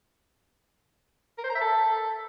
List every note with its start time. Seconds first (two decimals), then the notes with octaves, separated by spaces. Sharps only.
1.38 A#4
1.44 C5
1.50 A#5
1.55 E5
1.61 A4